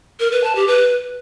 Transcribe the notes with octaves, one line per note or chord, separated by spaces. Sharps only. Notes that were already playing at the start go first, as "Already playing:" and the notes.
A#4
B4
A5
G4
B4